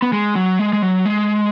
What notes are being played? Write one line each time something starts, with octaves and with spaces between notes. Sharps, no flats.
B3
G#3
F#3
G#3
G#3
F#3
G#3